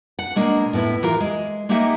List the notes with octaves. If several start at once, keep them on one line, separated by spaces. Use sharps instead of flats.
F#5
B2 G#3 A#3 D4
A2 B3 E4
E3 F4 G4 A#4
G#3
G#3 A#3 D#4 G4 E5 F#5